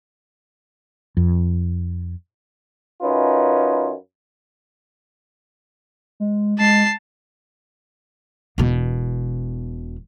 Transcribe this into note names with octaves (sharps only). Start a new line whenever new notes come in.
F2
F#2 C#4 D#4 F4 B4
G#3
G#3 A5 C7
E1 B2